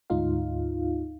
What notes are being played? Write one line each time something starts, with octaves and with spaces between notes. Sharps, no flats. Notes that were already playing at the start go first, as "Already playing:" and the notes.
D2 G#2 D#4 F4 F5